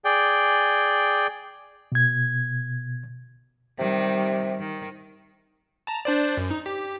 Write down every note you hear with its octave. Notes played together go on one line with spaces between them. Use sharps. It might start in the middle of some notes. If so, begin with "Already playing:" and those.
G#4 D5 G5
B2 G#6
C3 D#3 G3
D#3
A5 A#5
D4 C5 D5
F#2
D#4
G4